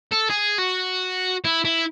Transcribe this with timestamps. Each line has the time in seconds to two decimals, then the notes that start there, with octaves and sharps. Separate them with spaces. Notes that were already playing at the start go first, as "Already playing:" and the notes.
0.12 A4
0.30 G#4
0.59 F#4
1.45 E4
1.65 E4